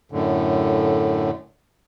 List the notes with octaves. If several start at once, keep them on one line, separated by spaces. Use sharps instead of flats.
F#2 A2 D3